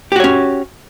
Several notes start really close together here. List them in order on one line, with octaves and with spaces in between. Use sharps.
G4 F#4 C#5 C#4